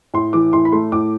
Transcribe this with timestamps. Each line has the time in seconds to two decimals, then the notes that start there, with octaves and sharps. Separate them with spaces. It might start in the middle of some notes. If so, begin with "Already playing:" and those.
0.14 A2 C6
0.33 E3 D6
0.53 A2 C6
0.65 B5
0.72 A3 C6
0.92 A2 D6